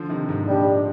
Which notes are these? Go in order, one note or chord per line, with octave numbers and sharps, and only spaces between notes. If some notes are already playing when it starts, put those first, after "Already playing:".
Already playing: D3 F3
C3 D#3
G#2
A#2 G3 D4 G4